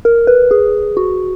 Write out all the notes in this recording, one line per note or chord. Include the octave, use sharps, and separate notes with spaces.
A#4
B4
G#4
F#4